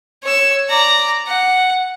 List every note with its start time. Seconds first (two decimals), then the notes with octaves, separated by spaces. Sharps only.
0.23 C#5 E6
0.69 D5 A#5
1.27 F#5